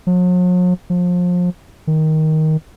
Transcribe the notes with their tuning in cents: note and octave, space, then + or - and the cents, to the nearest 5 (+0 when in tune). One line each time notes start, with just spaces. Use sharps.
F#3 -45
F3 +30
D#3 +10